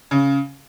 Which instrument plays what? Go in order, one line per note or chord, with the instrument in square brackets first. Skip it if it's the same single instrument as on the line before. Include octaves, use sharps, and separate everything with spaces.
[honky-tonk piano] C#3